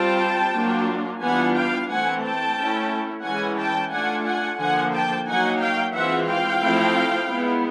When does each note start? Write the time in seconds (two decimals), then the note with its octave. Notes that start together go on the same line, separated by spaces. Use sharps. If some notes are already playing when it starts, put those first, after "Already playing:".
Already playing: G3 C4 F4 G5 A5
0.54 F#3 A#3 D4 F4
1.22 E3 G3 B3 D4 F4 F#5 G#5
1.55 F5 G5
1.89 E3 A3 C4 F#5 G#5
2.23 G5 A5
2.57 A3 C#4 E4
3.24 E3 G#3 C#4 E4 F#5 G#5
3.58 G5 A5
3.92 A3 D4 F4 F#5 G#5
4.26 F#5 G#5
4.59 D3 F3 A#3 F#5 G#5
4.93 G5 A5
5.27 F#3 A#3 D#4 F#5 G#5
5.61 F5 G5
5.95 E3 G#3 C4 F4 E5 F#5
6.28 F5 G5
6.62 F3 A3 C4 E4
7.29 G#3 B3 E4